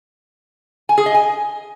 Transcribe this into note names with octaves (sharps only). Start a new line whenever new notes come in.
G#5
G#4
D#5
G#5